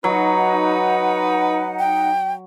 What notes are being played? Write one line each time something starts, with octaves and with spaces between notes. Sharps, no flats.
F#3 D#4 B4 F#5
G5